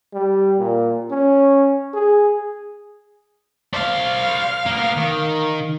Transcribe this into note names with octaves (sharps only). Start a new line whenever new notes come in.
G3
A#2
C#4
G#4
C5 D5 F5
A#3 B3
D#3